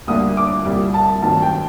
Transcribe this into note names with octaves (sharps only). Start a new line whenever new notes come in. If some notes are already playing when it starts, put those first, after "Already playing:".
D2 D3 G3 A#3 D#6
D6
C2 A#2 G3
A5
G2 D#3 F#3 A3 C4 A5
G5